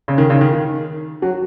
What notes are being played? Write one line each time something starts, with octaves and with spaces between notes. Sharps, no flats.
C#3
D#3
C#3
D#3
D#3
F#3